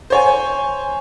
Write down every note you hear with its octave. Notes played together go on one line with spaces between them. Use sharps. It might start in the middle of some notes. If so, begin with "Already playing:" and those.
C5 C#5 G#5